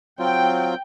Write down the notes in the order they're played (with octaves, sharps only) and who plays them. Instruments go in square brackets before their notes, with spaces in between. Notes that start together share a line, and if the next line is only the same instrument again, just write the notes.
[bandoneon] F#3 C4 F4 [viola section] G5